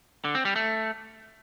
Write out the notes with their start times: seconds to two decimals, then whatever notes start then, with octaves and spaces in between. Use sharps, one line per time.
0.24 D3
0.35 C4
0.45 G3
0.56 A3